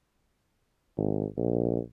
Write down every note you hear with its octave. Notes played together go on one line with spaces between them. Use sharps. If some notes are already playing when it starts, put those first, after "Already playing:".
G#1
A#1